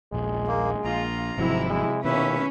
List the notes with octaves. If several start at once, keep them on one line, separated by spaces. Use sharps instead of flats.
D#1 A#1 G#3
A#3
A#1 F4 A#5
G#1 G#2 C3 F3 F#3 E4
G#3
D#2 B2 D#3 C#4 E4 B4 E5